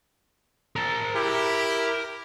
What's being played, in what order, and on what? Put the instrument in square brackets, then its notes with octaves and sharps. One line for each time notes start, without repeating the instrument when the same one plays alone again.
[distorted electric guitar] A#4 A5
[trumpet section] E4 G4